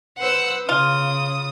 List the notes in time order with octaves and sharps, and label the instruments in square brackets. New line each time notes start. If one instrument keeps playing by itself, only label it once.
[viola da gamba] B4 C5 [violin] F#5 E6
[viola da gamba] C#3 [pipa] F4 [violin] D#6